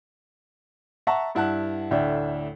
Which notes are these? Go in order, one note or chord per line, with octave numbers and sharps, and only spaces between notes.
E5 F#5 A5 A#5 C#6
G2 E4 F#5 A5 F#6
D2 A2 D4 E5 G5